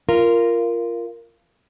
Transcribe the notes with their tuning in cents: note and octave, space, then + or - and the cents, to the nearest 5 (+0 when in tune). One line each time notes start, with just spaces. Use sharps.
F4 -15 A#4 +0